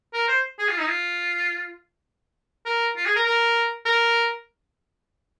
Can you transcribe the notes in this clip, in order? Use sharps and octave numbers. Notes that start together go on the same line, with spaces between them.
A#4
C5
G#4
F4
D#4
F4
A#4
F4
G#4
A#4
A#4
A#4